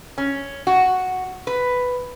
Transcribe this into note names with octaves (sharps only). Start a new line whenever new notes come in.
C#4
F#4
B4